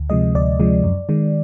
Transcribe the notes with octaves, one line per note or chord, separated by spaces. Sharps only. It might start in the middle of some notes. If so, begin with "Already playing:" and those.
Already playing: D2
C3 F3 G#3 D#5
D2 D5
C3 F3 G#3
F#2
D#3 G#3